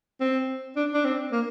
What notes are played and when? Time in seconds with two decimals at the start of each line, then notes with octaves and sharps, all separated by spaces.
0.21 C4
0.76 D4
0.94 D4
1.04 C4
1.32 A#3